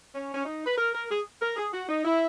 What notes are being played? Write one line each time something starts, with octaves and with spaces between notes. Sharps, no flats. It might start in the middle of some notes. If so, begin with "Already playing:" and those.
C#4
C#4
D#4
B4
A#4
A#4
G#4
A#4
G#4
F#4
D#4
E4